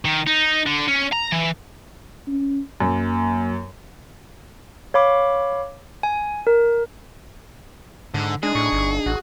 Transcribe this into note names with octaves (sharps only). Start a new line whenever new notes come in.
D#3
D#4
D3
C#4
A#5
E3
C#4
F#2 A#3
C#5 F5 B5 D6
G#5
A#4
G#2 D3
G#3 D4 D#4 G#4
A2 C#6
G1
A1 F#4